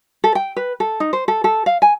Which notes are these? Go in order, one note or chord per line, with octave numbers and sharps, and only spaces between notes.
A4
G5
B4
A4
D#4
C5
A4
A4
F5
G#5